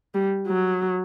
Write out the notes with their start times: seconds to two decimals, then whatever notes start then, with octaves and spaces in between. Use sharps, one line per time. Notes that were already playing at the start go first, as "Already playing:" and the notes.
0.14 G3
0.47 F#3